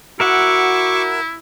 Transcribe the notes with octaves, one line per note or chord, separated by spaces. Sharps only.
E4 F#4 A#4 E5 F#5 C#6 D6 E6